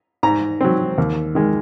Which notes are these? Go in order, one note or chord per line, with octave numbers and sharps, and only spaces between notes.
G#2 A#5
F#3 C4
D#2
D#3 G#3